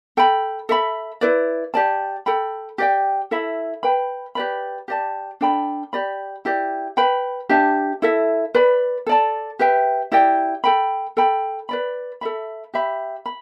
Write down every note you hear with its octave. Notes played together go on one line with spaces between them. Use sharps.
A4 G5 B5
A4 E5 B5
E4 B4 D5
G4 D5 A5
A4 G5 B5
G4 D5 G5
E4 A4 E5 B5
B4 G5 B5
G4 B4 D5 B5
G4 D5 A5
D4 A4 G5 B5
G4 D5 B5
E4 G4 D5
B4 G5 B5
D4 G4 E5 A5
E4 A4 E5
B4 D5 B5
A4 D5 A5
G4 B4 E5 G5
E4 G4 D5 G5
A4 G5 B5
A4 G5 B5
B4 D5 B5
A4 E5 B5
G4 E5 B5
B5